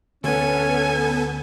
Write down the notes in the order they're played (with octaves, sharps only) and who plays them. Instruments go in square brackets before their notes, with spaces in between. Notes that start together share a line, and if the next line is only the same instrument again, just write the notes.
[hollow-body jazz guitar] D2 [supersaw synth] B3 A4 [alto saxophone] C#4 [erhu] G#5